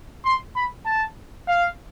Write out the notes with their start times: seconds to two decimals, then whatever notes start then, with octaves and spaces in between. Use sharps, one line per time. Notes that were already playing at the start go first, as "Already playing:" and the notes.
0.25 C6
0.56 B5
0.86 A5
1.48 F5